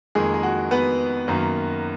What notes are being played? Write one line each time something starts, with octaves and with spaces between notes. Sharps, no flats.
F2 D#3 G#3 A#3 G#4
G#4
F#4
B3 B4
F#2 D#3 F#3 A#3